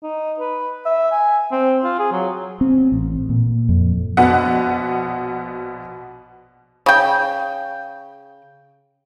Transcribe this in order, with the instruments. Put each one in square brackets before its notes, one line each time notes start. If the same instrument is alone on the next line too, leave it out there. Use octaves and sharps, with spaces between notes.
[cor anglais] D#4
B4
E5
G#5
C4
F4
G#4
F#3
[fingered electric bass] C4
A1
A#2
F2
[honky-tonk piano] A#1 B2 B3 F#5
[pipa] C#3 G5